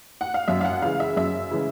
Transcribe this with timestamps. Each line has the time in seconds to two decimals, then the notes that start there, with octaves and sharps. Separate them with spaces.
0.21 F#5
0.34 F5
0.48 F#2 E5
0.61 F5
0.65 F#5
0.82 C#3 E3 G#3 F5
1.00 E5
1.16 F#2 E5
1.51 C#3 E3 G#3